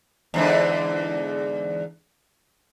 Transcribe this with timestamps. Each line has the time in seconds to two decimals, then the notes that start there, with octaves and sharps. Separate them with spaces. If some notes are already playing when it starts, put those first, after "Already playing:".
0.34 E2 G#2 D3